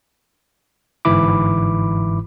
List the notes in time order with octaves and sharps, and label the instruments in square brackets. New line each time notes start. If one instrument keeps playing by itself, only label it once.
[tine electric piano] G1 G#2 E3 E4 B5 D6